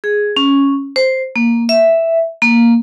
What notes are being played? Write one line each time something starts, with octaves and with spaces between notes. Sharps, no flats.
G#4
C#4
C5
A#3
E5
A#3